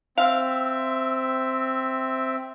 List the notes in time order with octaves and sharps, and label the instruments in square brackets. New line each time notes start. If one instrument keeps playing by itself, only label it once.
[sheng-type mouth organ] C4 E5 [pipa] F5